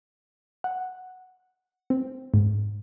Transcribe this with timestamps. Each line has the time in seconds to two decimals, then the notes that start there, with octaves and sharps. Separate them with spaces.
0.64 F#5
1.90 C4
2.34 G#2